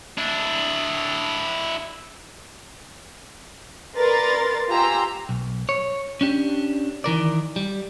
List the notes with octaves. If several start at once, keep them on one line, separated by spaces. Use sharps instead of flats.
D4 E4
A#4 B4 D5 A#5 C6 A6
F4 G4 G#5 A#5 C6 E6
B1
C#5
C#4 D4 G4
D#3 E3 A#4 D5
G3